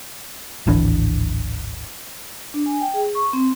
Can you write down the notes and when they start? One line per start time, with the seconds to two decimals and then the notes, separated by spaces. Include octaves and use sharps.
0.67 D1 G#1 E3 D4
2.54 D4
2.66 G#5
2.81 G5
2.94 G#4
3.15 C#6
3.33 C4